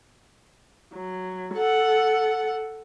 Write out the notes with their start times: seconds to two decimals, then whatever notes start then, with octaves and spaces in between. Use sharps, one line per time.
0.93 F#3
1.54 A4 F#5